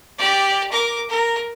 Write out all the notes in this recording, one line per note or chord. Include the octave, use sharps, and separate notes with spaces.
G4 D5
A#4 D6
A#4